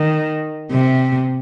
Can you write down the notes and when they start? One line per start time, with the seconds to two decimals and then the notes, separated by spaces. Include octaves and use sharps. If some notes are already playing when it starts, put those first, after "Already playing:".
Already playing: D#3
0.72 C3